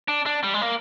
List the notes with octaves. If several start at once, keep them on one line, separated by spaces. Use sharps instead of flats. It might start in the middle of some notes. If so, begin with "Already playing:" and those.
D4
D4
G3
G#3
A#3